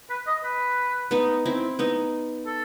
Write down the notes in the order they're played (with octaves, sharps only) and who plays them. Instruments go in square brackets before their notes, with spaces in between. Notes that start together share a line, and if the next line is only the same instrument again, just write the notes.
[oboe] B4
D#5
B4
[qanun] B3 D#4
C4 E4
B3 D#4
[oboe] A4